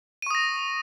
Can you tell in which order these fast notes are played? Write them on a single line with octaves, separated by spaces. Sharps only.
D#7 C#6 D#6 A#6